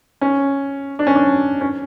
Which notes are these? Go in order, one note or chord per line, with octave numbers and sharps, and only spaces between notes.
C#4
D4
C#4
D4
C#4